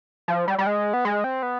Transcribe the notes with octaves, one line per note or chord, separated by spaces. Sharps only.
F3
G3
G3
G#3
B3
G#3
C4
B3